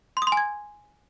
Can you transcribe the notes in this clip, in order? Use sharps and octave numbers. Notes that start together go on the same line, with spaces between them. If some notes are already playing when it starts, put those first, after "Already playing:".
C6
D#6
C6
G#5
G#6